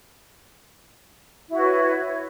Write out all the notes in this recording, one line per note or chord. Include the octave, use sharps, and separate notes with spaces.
E4 F#4 B4 C#5